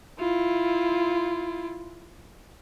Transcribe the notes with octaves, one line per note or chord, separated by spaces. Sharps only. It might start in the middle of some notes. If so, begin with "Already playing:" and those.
E4 F4